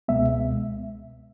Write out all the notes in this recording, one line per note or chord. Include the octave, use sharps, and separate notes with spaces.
C#2 B2 G#3 B3 E5